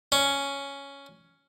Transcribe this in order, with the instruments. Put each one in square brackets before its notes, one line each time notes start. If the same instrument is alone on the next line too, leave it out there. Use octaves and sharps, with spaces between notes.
[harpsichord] C#4